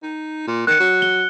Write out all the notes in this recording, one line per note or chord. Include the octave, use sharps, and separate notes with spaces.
D#4
A#2
D#3 F#6 C#7
F#3
G7